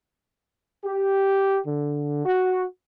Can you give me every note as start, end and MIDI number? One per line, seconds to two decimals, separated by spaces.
0.85 1.59 67
1.67 2.23 50
2.25 2.63 66